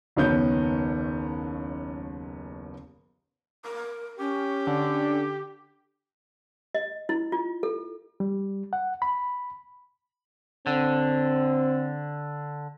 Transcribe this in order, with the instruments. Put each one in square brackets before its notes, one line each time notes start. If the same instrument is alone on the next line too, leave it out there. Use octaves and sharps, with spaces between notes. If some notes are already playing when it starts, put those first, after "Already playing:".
[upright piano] F#1 D#2 D#3 B3 C#5 G6
[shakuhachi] A#4
[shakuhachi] C#4 [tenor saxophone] G4
[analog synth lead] D3
[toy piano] D#5
E4
F4
A4
[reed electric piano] G3
F#5
B5
[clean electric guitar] D3 [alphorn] C4